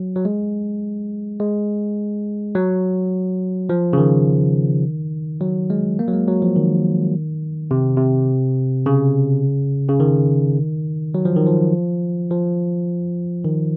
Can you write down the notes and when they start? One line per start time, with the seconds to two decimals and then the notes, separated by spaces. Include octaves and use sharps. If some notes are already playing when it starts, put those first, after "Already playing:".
Already playing: F#3
0.16 F#3
0.25 G#3
1.40 G#3
2.55 F#3
3.69 F3
3.93 C#3
3.98 D#3
5.41 F#3
5.70 G#3
5.99 A#3
6.08 F#3
6.13 G#3
6.28 F#3
6.42 F3
6.56 D#3
7.71 C3
7.97 C3
8.86 C#3
9.89 C#3
10.00 D#3
11.14 F#3
11.25 F3
11.36 D#3
11.47 F3
12.30 F3
13.45 D#3